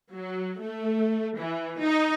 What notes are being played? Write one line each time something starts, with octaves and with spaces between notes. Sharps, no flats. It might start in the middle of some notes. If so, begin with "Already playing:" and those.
F#3
A3
E3
D#4